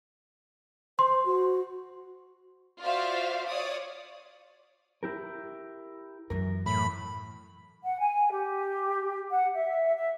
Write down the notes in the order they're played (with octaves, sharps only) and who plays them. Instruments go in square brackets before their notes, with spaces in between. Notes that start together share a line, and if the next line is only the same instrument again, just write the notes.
[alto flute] C5 [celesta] C6
[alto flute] F#4
[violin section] F4 F#4 C5 D5 E5 F5
C#5 D5 D#6
[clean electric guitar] E4 G4 A#4
[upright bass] F#2 E3 [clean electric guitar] A#4
[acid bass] A2 [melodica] B5
[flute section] F#5
G#5
G4
F#5
E5
E5